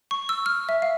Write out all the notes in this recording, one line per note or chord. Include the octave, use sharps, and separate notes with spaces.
C#6
E6
F6
E5
F5